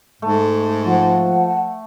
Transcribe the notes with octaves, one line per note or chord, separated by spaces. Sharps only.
G#2 A3
F3 F#5